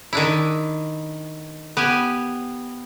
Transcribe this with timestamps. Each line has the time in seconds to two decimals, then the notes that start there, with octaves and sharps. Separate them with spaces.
0.13 D#3 D4 E4
1.77 B3 G4 G#5